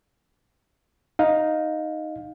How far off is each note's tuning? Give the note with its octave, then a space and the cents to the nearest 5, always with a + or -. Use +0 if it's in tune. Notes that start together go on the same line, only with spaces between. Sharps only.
D#4 +0 F5 +20